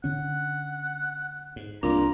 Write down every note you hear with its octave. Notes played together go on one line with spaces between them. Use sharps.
D3 C#4 F#5
G#2
C2 G2 A#2 D4 A#5